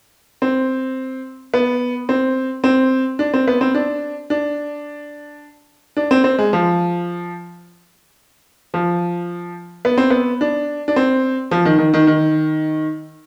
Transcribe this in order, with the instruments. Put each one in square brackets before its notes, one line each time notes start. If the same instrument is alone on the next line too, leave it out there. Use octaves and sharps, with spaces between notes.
[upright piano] C4
B3
C4
C4
D4
C4
B3
C4
D4
D4
D4
C4
C4
G#3
F3
F3
B3
C4
B3
D4
D4
C4
F3
D#3
D#3
D#3
D#3